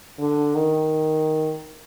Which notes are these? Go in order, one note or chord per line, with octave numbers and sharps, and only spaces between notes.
D3
D#3